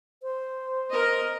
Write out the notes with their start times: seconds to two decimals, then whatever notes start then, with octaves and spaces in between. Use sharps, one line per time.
0.23 C5
0.90 A#4 D#5